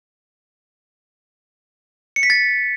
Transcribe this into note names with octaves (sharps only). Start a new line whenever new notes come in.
C#7
B6
A6